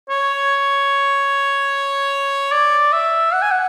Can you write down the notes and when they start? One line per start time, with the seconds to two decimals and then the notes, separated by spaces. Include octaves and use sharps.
0.10 C#5
2.52 D5
2.93 E5
3.33 F#5
3.42 G#5
3.52 F#5